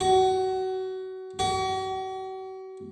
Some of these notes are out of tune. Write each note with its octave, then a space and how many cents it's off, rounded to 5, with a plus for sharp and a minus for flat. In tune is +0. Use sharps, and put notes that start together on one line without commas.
F#4 +25
F#4 +40